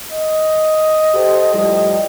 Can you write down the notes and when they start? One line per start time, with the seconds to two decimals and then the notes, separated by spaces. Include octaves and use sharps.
0.12 D#5
1.14 G4 A4 C5
1.53 A2 F3 G3